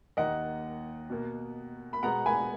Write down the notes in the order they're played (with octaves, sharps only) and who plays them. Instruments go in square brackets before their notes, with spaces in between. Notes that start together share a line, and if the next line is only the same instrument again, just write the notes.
[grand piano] D#2 D#3 A#3 D#5 F#5
B2 A#3
B5
B2 G#3 B3 F#5 A#5
G#5 B5